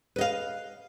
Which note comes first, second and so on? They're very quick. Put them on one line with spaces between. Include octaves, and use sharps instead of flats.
B4 D#5 F5